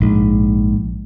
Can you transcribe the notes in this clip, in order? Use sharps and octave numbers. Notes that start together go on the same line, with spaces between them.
A#1 G#2